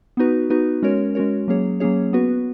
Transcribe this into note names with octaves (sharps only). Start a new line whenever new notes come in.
B3 D#4 F#4 B4
B3 D#4 F#4 B4
G#3 C#4 F#4 A#4 C#5
G#3 C#4 F#4 A#4 C#5
F#3 A#3 C#4 G#4 C#5
F#3 A#3 C#4 G#4 C#5
B3 F#4 B4